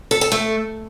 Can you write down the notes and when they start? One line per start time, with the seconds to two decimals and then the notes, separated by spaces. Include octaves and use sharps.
0.11 A4
0.21 A4
0.32 A3